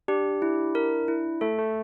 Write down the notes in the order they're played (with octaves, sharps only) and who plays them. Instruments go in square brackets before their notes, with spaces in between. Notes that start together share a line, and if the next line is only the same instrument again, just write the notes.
[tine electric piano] D4 [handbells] G4
[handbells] E4
A#4
E4
[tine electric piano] A3 [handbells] A4
[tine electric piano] A3